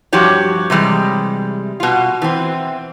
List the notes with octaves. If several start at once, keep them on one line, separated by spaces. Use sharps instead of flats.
G2 F3 F#4 G4 C#5
C3 E3 G3 G#3
B2 F4
E3 C4